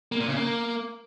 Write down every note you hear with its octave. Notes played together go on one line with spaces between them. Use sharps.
A#3
A#2
C#3
A#3